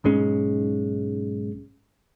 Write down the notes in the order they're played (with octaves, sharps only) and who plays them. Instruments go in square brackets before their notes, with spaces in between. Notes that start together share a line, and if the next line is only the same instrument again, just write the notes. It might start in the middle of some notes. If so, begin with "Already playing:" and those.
[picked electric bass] B1 G#2 G#3 C#4